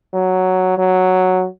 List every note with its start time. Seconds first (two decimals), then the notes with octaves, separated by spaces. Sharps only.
0.14 F#3
0.78 F#3